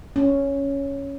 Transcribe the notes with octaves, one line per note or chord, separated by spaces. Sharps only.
C#4